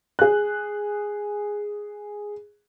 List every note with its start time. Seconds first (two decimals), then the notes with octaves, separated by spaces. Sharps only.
0.19 G#4 F#6